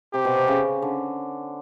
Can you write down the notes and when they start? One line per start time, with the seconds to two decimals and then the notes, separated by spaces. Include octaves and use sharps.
0.13 C3 G4
0.25 B2
0.36 C3
0.48 C#3
0.82 D3